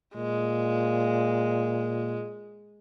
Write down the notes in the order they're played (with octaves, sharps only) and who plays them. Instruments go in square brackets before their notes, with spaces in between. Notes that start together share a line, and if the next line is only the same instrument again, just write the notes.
[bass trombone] A#2 [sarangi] G#3